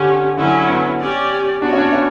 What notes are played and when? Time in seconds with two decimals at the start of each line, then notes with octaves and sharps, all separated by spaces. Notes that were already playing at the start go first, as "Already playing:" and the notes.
Already playing: D3 C#4 G4
0.37 D3 F#3 C#4 E4
0.69 B3
1.00 C#4 G4 D5
1.62 B3 D4 F#4 C#5
1.73 C#4
1.78 D4
1.93 C#4